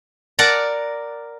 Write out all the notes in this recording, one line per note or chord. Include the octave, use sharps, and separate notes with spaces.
A#4 D5 F#5 A5 A#5